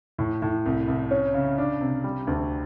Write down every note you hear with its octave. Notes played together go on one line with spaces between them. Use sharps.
A2
A2
C2
C2
C#4
C#3
D4
C3
G3
D2